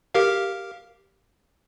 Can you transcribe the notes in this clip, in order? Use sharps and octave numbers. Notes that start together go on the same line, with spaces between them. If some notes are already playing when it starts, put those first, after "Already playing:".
G4 A#4 F5